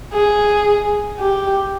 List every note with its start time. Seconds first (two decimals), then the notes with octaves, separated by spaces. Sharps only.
0.13 G#4
1.19 G4